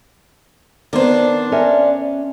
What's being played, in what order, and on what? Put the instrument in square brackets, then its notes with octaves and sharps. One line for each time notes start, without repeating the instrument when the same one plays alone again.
[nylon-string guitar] D#3 B3 C4 [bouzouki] D4 C5
[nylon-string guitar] C#4 A#4 E5